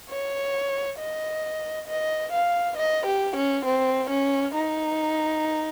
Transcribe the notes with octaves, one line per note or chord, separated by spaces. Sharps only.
C#5
D#5
D#5
F5
D#5
G4
C#4
C4
C#4
D#4